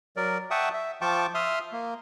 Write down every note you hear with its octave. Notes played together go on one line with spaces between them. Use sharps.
F#3 A#4 D5
E5 F#5 G5 A5 C#6 D#6
E5
F3 F4 G5 A5 C#6 D6
E5 C6 D#6 F6
A#3